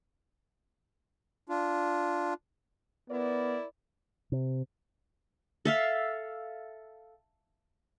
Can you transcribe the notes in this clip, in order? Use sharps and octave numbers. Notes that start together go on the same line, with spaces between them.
D4 F4
B3 E4 A#4 D5
C3
A4 E5 F5